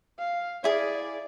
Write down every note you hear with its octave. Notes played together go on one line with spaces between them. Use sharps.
F5
E4 G#4 D5 G#5